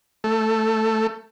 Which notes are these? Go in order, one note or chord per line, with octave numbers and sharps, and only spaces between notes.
A3